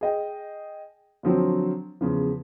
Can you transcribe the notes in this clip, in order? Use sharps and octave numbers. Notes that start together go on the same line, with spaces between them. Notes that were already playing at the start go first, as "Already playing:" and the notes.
G#4 D#5 G5
D3 F3 F#3 C4
E2 C#3 F3